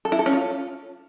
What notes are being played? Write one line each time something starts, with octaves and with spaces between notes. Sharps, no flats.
A4
E4
A4
C#4
F4